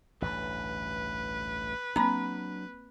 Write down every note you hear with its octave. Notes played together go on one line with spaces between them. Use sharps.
A1 D2 G2 B4
F#3 A#3 C4 D4 A#5 B5